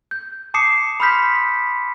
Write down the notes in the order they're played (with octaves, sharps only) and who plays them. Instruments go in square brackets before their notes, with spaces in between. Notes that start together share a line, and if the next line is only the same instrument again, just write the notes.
[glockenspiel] G6
A5 D6 D#6 C7 C#7 E7
B5 C6 D#6 F6 G6 B6